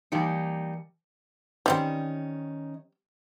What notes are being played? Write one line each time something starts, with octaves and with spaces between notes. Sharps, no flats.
E3 G3 A#3 D#4 C#7
D#3 G3 C4 C#4 D#4